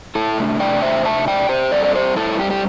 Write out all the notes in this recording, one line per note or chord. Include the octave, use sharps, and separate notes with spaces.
E4 A4
C3 A3 D4
D5 G5
C5 E5
E5 A5
D5 G5
G4 C5
G2 G3 C4 A4 D5
D5
G4 C5
E4 A4
G4
G4